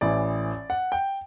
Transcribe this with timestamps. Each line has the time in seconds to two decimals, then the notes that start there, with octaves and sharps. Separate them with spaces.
0.01 A1 A2 E3 D5
0.70 F#5
0.92 G5